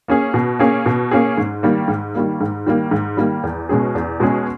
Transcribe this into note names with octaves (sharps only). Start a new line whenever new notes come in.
A#3 C#4 G#4
B2
A#3 C#4 G#4
B2
A#3 C#4 G#4
G#2
D#3 G3 A#3
G#2
D#3 G3 A#3
G#2
D#3 G3 A#3
G#2
D#3 G3 A#3
E2
B2 G#3 C#4 G#4
E2
B2 G#3 C#4 G#4